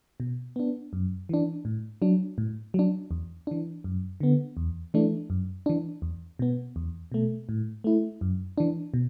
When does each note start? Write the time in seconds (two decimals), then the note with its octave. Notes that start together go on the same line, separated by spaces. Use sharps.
0.20 B2
0.56 B3 D4
0.93 F#2
1.29 E3 D4
1.65 A2
2.02 F#3 D4
2.38 A2
2.74 F#3 D4
3.11 E2
3.47 E3 D4
3.84 F#2
4.20 D3 B3
4.57 E2
4.94 E3 A3 D4
5.30 F#2
5.66 E3 D4
6.02 E2
6.39 B2 B3
6.76 E2
7.12 B2 A3
7.49 A2
7.84 A3 E4
8.21 F#2
8.58 E3 D4
8.94 B2